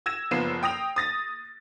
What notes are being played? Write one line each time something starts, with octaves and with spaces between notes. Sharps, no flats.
E6 G#6 A#6 E7
F#1 F3 B3 C7 E7
G5 D#6 A#6 F7
D#6 A6 A#6